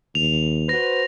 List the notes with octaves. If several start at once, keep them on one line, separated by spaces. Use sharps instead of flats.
D#2 F7
F#4 B4 C5 A#6